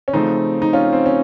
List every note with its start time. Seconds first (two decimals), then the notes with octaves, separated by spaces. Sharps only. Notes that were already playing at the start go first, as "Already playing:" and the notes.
0.08 C#4
0.13 C#3 F3 A3 C4 D#4
0.62 D#4
0.73 C#4 F4
0.93 C4
1.06 C#4